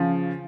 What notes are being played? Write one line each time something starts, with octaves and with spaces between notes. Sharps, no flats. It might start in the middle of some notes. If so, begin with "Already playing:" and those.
Already playing: C#3 F3